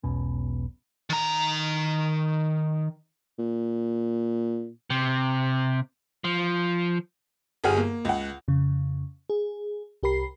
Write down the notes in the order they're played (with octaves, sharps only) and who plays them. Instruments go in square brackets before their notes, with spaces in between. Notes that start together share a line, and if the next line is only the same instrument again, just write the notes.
[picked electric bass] E1 B1 B2 C#4
[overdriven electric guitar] D#3 A#5
[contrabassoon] A#2
[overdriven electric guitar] C3
F3
[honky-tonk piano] G1 G3 G#4 F#5 F6
A#3
C#2 F#5
[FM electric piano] F2 C#3
G#4
C2 G4 A#4 B5 C7